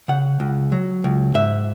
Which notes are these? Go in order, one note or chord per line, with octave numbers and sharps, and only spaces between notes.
C#3 F#5
C#2
F#3
C#2
G#2 E5